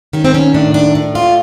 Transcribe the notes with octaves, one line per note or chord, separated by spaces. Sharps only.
D#3 C#4
C4
C#4
A2 D4
D4
A2
F4